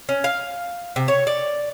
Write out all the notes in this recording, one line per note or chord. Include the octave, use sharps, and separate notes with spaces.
C#4
F5
C3
C#5
D5